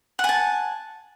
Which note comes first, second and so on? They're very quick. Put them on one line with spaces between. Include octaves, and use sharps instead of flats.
F#5 G#5 A5